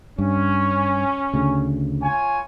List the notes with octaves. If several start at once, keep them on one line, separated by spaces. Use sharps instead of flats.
G2 C#4
D2 C#3
F4 C#5 G#5